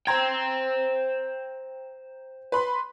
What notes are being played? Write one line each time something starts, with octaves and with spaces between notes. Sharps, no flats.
C5 G5 A#5 G#6
B4 B5 C6